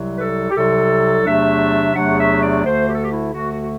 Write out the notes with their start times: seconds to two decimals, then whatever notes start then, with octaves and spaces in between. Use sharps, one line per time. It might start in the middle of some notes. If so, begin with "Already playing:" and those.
Already playing: C2 C3 F#3
0.17 B4
0.21 A4
0.50 G4
0.55 C2 C3 F#3 A4
1.25 E2 C3 F#3 A3 D4 E5
1.95 E2 C3 F#3 A3 D4 F#5
2.19 E5
2.41 D5
2.64 D2 D3 A3 C5
2.87 G4
2.94 A4
3.02 G4
3.11 E4
3.33 D2 D3 A3 F#4
3.51 F#4
3.62 F#4